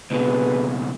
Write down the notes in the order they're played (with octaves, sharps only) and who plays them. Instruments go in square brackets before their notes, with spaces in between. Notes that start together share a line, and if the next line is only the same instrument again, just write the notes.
[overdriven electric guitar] C#2 B2 [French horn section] D3 G#4 B4